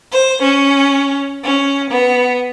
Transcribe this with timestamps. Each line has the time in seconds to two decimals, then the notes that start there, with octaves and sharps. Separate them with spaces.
0.11 C5
0.42 C#4
1.42 C#4
1.90 B3